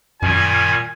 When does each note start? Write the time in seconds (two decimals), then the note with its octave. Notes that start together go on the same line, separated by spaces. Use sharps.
0.22 F#2 A#2 D#3 G3 G#5